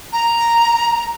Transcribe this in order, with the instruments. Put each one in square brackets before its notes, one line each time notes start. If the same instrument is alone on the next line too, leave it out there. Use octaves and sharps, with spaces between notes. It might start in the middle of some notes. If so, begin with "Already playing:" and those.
[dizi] A#5